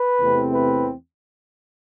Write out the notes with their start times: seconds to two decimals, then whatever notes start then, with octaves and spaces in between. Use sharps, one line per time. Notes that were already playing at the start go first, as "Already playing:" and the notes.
Already playing: B4
0.18 E2 C3 E3 A3 C4
0.55 B4